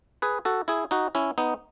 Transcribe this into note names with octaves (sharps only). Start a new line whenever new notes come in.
G#4 B4
F#4 A4
E4 G#4
D#4 F#4
C#4 E4
B3 D#4